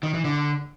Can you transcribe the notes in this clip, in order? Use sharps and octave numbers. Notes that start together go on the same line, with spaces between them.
D#3
E3
D3